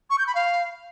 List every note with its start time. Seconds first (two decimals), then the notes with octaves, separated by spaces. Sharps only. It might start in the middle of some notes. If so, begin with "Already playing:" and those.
0.10 C#6
0.19 G6
0.27 B5
0.35 F5